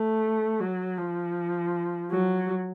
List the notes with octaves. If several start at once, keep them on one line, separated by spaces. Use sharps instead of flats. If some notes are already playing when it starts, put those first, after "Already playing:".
Already playing: A3
F#3
F3
F#3